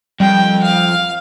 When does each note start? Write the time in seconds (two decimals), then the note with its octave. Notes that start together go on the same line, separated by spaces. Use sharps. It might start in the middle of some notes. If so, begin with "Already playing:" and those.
0.20 F2 G3 G5
0.64 F5